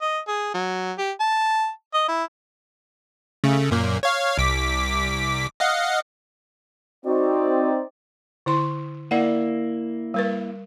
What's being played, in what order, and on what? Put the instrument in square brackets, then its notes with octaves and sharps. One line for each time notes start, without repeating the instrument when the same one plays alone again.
[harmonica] D#5
G#4
F#3
G4
A5
D#5
E4
[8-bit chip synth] C#3 A3
F#2 A#2 A#3
C#5 F5
C2 D6 B6
D#5 F5 F#5
[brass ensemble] C4 D#4 D5 [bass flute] F#4
[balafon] D3 E4 C6
[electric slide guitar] A#3 E4 [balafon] D5 F#5
[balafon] G3 A#4 B4